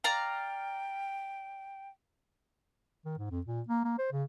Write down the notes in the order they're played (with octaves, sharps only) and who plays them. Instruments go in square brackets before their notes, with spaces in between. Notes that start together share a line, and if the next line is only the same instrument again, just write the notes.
[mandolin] D5 F5 A#5 [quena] G5
[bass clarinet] D#3
G#2
F2
A#2
A#3
A#3
C5
C#3